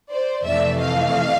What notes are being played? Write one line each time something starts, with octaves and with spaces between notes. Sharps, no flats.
C5 D5
F2 C3 E3 A3 D5 E5
D#5 F5